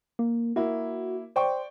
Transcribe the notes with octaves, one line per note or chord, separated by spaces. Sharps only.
A#3
A#3 E4 F#4
C5 D5 G5 C#6